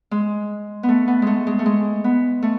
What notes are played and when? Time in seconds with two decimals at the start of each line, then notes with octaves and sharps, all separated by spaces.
0.11 G#3
0.83 B3
0.89 A3
1.08 B3
1.22 G#3 A3
1.47 G#3
1.59 A3
1.66 G#3
2.04 B3
2.42 A3